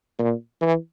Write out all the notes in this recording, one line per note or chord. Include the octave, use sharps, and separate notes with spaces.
A#2
E3